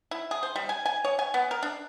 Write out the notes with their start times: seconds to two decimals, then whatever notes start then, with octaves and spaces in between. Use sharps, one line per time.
0.11 E4
0.31 G#4
0.43 C5
0.56 G3
0.69 G#5
0.85 G#5
1.05 C#5
1.19 G#5
1.34 B3
1.51 A#4
1.63 D4